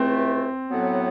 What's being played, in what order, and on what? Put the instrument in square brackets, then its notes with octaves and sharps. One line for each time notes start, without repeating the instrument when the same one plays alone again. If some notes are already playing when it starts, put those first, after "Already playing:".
Already playing: [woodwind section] C#2 C3 E3 A3 [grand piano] C4
[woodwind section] A2 F#3 B3